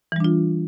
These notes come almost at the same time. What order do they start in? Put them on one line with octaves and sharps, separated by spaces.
E3 G3 D4 F4